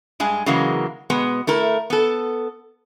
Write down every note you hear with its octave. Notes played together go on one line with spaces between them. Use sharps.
G2 G#3 G#4
C#3 E3 F#3 G#3 A#3
B2 G#3 B3
A3 E4 A#4
B3 A4